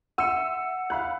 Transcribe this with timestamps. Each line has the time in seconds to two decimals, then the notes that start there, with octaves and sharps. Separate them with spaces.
0.18 E5 F#5 E6 C#7
0.90 F5 B5 F#6